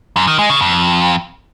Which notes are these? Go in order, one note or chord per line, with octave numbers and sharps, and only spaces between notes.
F#2
D#3
G#3
C#3
F2